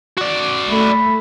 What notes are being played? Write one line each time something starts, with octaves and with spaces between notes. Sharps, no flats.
F#4 D5
A3 B5